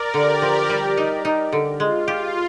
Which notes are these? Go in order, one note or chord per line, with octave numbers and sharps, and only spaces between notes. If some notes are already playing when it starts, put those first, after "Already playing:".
Already playing: A#4 D5
D3 G4
F3
G3
D#4
D#4
D3
G#3 F4
G4